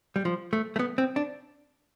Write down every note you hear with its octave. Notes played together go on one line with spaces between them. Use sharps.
G3
F3
A3
A3
B3
C4
D4